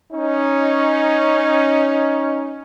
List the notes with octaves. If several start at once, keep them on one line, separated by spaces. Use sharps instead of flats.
C#4 D#4